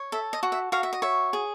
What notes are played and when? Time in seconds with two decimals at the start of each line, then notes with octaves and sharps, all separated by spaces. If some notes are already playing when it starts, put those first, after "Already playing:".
Already playing: C#5
0.12 A4 E5
0.33 D#5
0.43 F#4
0.52 E5
0.72 F#4 F5
0.83 E5
0.93 D#5
1.02 C#5 E5
1.33 G#4